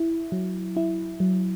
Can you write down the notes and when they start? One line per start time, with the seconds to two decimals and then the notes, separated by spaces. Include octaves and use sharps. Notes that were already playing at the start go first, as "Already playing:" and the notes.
Already playing: E4
0.32 F#3
0.76 E4
1.20 F#3